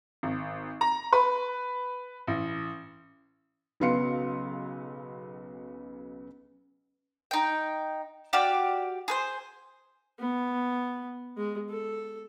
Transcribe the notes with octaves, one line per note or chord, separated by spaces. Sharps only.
G#1
A#5
B4
A1
B1 C#3 B3 F5 C6 C#7
D#4 G5
F#4 G4 D5 F5
G#4 B4 C5
B3
G#3
A4